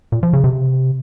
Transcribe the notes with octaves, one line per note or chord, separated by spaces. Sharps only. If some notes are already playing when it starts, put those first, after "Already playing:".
A#2
F3
C#3
C3